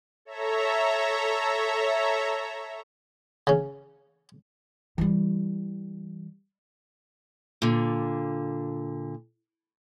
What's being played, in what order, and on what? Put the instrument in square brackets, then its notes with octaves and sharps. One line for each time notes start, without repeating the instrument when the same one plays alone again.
[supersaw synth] A4 C#5 E5 A#5
[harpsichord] C#3 C#4
[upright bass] E3 G3
[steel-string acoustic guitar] A#2 D3